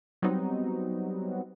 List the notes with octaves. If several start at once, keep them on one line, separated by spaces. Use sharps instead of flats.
F#3 G3 B3 C4 D#4 F#4